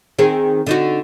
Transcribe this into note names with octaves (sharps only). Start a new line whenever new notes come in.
D#3 C4 G#4
D3 D#4 F#4